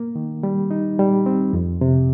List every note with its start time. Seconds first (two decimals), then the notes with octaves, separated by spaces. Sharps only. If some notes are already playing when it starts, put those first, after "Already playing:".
Already playing: A#3
0.16 D#3
0.43 G3
0.71 D#4
0.99 G3
1.26 C4
1.53 F2
1.81 C3